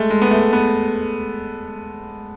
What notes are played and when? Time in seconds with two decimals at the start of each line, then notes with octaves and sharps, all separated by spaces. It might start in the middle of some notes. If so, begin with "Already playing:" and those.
Already playing: G#3 A3
0.10 G#3
0.22 B3
0.31 A3
0.53 B3